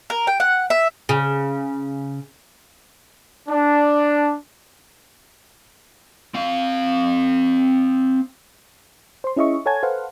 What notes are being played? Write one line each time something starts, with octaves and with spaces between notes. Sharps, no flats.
A#4
G5
F#5
E5
C#3
D4
C4 F5
C5 C6
C#4 E4 G#4 D#5 E5 C#6
A4 C#5 F#5 G#5 A5 G#6
A4 B4 C5 F5 F#5